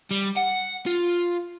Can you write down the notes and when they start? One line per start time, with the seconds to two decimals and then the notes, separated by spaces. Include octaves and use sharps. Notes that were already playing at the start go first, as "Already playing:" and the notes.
0.11 G3
0.36 F#5
0.86 F4